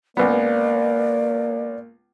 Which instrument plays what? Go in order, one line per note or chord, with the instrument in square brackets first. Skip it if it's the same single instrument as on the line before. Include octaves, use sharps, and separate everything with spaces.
[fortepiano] C#2 B3 [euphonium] A#3 [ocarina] D5